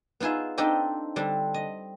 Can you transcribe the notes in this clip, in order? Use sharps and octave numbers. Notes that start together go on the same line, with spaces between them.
B3 D#4 F4 G#4 E5
C4 D4 D#4 G4 A4 D#5
D3 G3 C4 D4
D#5